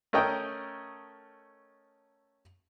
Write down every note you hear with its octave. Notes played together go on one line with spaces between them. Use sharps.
A3 C#4 A#4 D#5 G5